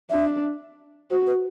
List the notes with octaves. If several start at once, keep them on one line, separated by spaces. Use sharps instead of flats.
D4 E5
F#4 C5
B4